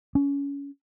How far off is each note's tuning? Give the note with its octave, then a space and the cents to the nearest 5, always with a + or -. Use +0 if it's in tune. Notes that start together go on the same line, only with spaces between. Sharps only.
C#4 +25